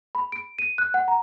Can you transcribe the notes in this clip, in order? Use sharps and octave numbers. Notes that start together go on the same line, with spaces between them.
B5
D7
D#7
F#6
F#5
A#5